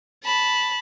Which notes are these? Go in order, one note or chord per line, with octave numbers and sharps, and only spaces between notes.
A5 B5